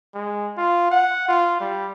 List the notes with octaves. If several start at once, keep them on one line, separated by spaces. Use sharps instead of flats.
G#3
F4
F#5
F4
G3